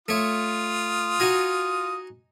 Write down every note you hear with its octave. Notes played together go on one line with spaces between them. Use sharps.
A3 F4 C#5 D#6
D#4 F#4 G#5